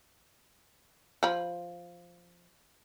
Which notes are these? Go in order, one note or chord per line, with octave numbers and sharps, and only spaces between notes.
F3 B5